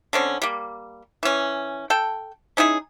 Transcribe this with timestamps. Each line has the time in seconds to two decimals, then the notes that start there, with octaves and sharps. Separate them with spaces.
0.13 D3 C4 C#4
0.42 G3 A#3
1.23 E3 C#4
1.90 A4 G5
2.57 C#4 D#4 E4 G#4